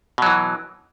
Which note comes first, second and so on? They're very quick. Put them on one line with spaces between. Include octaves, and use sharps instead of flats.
B2 F#3 E3